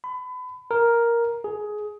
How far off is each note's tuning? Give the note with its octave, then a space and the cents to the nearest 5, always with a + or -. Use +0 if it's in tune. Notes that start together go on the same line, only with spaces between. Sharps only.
B5 +30
A#4 +5
G#4 +15